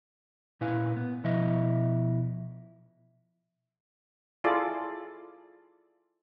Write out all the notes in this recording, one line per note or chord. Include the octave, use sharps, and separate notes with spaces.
A#2 E4 B4 F5 G#5
B3
B2 F3 E4 D#5 E5
E4 F4 G#4 A4 D5